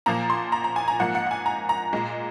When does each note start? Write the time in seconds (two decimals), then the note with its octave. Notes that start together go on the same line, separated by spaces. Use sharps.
0.06 A#2 F3 A#3 A#5
0.30 C6
0.52 A#5
0.64 A#5
0.76 G#5
0.88 A#5
0.99 G#2 F3 A#3 F#5
1.15 F#5
1.26 F#5
1.31 G#5
1.46 A#5
1.69 A#5
1.93 A#2 G#3